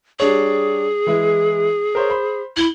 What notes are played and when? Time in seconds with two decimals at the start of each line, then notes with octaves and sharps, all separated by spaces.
0.20 G3 D4 G#4 C#5
1.07 E3 G#3 E4
1.95 A#4 C5 C#5
2.10 C5 B5
2.57 E4 F#7 G7